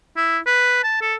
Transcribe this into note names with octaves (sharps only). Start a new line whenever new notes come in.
E4
B4
A5
A4